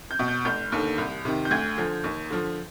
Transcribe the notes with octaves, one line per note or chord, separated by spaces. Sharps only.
G6
B2
G6
F1 G6
D#2 D3
C2
C3 D#3
G6
D2 G#6
D3 F3
D#2
D3 F3